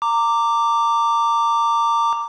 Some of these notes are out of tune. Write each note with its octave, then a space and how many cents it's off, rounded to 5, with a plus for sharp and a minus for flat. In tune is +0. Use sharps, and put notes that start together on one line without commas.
A#5 -20 D6 +0